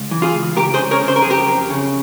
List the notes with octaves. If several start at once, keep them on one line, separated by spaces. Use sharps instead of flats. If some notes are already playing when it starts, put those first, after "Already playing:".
Already playing: C#2
E3
F4 G#4
C#2
C#2 G4 A#4
G#4 C5
C#3
A#4 C#5
C#3
C5
A#4
G#4
F2
G4 A#4
F2
C#3